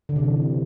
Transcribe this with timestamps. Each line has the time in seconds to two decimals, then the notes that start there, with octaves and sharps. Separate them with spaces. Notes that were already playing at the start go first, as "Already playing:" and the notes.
0.09 D3
0.16 C3
0.23 E3